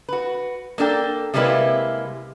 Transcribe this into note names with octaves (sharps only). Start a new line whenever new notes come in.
F#4 B4
A#3 D4 A4 G5
C3 G3 G#3 A#3 E4 B4